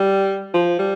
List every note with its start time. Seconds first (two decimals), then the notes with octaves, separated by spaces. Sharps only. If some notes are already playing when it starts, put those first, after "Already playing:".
Already playing: G3
0.54 F3
0.79 G3